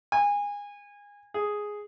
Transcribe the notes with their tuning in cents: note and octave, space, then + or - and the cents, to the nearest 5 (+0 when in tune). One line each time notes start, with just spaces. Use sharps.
G#5 -25
G#4 +0